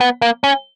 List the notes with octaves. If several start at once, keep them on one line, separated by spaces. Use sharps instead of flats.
B3
A#3
C#4